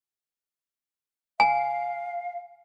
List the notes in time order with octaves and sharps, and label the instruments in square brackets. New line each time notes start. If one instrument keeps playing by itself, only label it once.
[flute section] F5 [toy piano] G#5